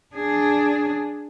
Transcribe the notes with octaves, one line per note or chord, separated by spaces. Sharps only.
D4 G#4